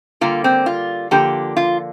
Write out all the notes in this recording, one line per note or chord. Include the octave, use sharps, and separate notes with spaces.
D3 G3 A#3 F4
C4
F4
D3 F3 A#3 G4
F4